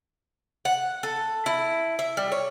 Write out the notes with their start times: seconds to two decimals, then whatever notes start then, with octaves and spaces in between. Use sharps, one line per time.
0.65 F#5
1.03 A4
1.46 E4
1.99 E5
2.17 G3
2.32 C#5